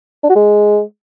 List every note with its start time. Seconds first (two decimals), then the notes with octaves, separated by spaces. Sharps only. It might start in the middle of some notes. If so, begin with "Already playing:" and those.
0.24 D4
0.29 F#4
0.35 G#3